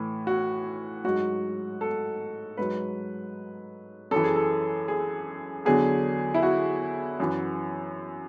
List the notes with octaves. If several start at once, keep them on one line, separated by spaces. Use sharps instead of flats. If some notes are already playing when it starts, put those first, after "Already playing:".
Already playing: A2 E3
F#4
G#2 F#3 F#4
A4
G#2 F#3 B4
F#2 E3 A4
G#4
A4
G#4
E2 D3 F#3 G#4
E4
F#4
F#2 E3